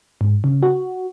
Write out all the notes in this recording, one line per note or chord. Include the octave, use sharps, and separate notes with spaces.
G#2
C#3
F#4